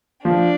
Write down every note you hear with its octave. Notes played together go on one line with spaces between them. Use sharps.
F3 D4